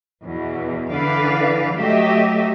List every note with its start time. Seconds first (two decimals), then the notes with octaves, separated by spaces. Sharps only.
0.25 E2 B2
0.90 D3 E3 B4 D5 F5
1.76 F#3 A3 G4 D#5 E5